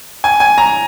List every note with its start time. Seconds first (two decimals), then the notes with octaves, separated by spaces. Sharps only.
0.24 G#5
0.40 G#5
0.58 A#5